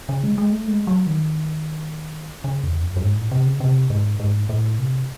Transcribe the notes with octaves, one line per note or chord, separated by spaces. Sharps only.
C#3
G#3
G#3
A3
G#3
F#3
D#3
C#3
E2
F#2
F#2
G#2
A2
C3
C#3
C3
G#2
G#2
A2
C3